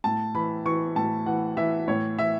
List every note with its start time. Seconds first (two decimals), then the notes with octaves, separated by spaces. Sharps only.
0.04 A2 A5
0.34 E3 B5
0.65 E3 C#6
0.96 A2 A5
1.26 E3 F#5
1.57 E3 E5
1.88 A2 C#5
2.18 E3 E5